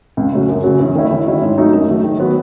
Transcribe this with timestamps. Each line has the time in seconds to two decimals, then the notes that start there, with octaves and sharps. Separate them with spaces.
0.17 C#2
0.32 C#3 F#3 A3
0.49 F#2
0.63 C#3 F#3
0.80 E2
0.95 D#3 A3 C#4 E4
1.11 D#3
1.26 F#3 C#4 E4
1.42 G#2
1.58 F#3 A3 D#4
1.72 F#2
1.88 D#3 F#3 A3
2.04 D#3
2.20 F#3 B3